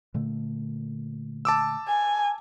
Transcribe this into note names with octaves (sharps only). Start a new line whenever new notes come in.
A#2 D3 A3
A5 D6 E6
G#5